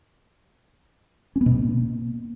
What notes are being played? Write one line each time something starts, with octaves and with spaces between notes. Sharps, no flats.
C#4
B3
B2
A#3